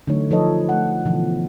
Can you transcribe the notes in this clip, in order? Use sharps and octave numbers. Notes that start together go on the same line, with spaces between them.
D3 E3 F#3 A3 D#4 C#5
F3 D#4 A4 B4 C#5 D#5
A3 F#5
B2 D3 E3 F3